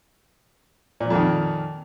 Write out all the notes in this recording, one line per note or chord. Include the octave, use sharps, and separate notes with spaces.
F2 A#2 D#3 F3